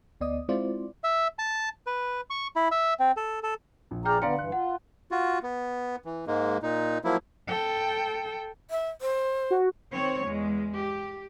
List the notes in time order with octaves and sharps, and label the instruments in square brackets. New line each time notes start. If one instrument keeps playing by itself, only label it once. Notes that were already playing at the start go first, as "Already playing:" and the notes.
[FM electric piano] D2 B3 D5 D#5 D#6
G#3 C4 E4 F4 C5 D5
[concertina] E5
A5
B4
C#6
E4
E5
C4
A4
A4
[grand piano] A#1
[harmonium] G#4 D5 A#5 [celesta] G5 F6 G6
[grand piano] D3 D5 A#5 [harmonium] B3 [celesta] F5 C6 C#7
[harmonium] G2 E3 [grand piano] F#6
[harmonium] F4 [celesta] F#5
[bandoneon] F4 F#4
B3
E3
G#2 G#3 A#3
A#2 D#4
F3 F#3 A#3 E4
[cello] A4 G5
[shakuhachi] E5
C5
[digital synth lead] F#4
[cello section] D#3 C4 C#5
E2 G#3
G4